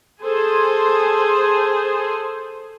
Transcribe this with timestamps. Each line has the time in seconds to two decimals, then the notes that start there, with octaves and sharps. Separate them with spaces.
0.22 G#4 A4 C5 G#5